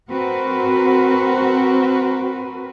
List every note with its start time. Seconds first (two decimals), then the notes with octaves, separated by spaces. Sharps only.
0.10 C4 F#4 A#4 B4